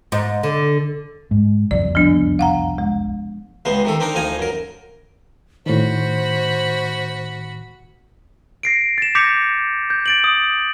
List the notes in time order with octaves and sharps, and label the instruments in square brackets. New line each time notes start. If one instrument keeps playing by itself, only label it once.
[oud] G#2
D3
[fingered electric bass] G#2
[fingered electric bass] F#1 C2 F2 [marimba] D5
[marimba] F3 B3 D4
F5 F#5 A#5
G#3
[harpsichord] C#2 C3 G#3 B3 C5
C3 D#3 A4
C4 D4 D#4 A#4 A#5
D2 F3 D#4 F5 G#5 A#5
F#2 A#4
[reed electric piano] A2 D#3 [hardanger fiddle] F#4 B5 [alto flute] C5
[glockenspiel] A#6 C7 D7
A6 E7
D6 G6 A#6 B6 C#7 F7
G6
A6 D7 F#7
D#6